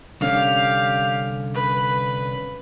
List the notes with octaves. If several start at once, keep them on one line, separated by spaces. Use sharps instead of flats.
C2 D3 C#4 G4 F5
B4